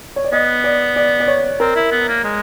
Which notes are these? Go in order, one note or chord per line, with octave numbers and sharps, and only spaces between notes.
C#5
D5
B3 D#5
D5
D5
D5
C#5
C4 A#4
E4
B3
A#3
G#3